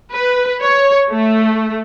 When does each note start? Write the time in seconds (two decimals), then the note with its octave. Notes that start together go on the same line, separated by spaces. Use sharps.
0.11 B4
0.61 C#5
1.10 A3